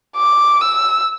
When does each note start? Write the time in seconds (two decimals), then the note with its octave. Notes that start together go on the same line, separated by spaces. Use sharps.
0.17 D6
0.61 E6